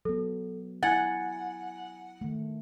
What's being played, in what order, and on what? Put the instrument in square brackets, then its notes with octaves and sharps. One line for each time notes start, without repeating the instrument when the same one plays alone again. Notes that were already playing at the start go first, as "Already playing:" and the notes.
[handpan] F#3 B3 [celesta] A4
[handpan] E4 [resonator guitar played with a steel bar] F#5 [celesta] G#5 G#6 A6
[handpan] D#3 A3